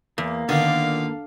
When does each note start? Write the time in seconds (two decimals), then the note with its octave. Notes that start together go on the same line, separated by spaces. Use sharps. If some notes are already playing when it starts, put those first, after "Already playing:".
0.18 E2 A#3
0.49 A#2 D3 D#3 B3 F5